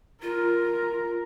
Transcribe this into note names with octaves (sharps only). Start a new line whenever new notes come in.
F4 A#4